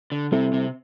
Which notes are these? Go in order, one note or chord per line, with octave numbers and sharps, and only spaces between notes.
D3
C3 G3 C4 E4 A4
C3